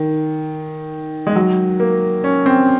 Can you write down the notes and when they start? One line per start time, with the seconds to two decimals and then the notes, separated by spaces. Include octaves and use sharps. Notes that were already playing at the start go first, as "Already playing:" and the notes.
Already playing: D#3
1.27 G#3
1.36 F#3
1.80 A#3
2.24 C#4
2.46 C4